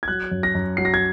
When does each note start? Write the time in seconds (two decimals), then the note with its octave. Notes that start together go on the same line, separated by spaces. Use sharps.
0.03 G#6
0.08 F#3 F#6
0.31 F#2
0.43 A#6
0.55 F#2
0.77 F#3 C7
0.85 A#6
0.94 G#6